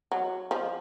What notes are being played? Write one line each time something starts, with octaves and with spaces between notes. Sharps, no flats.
F#3
F3